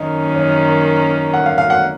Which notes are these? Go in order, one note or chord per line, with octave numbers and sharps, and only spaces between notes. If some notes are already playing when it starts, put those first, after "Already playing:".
Already playing: F#2 D#3 A#3 C#4 D#5
C#5
F#5
F5
F5
F#5